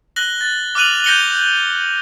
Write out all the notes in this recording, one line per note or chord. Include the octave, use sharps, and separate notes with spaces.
F#6 A#6 F#7 G7
A6
D6 F6 F#6 D#7 F7 F#7
G6 A#6 C#7 F#7 G7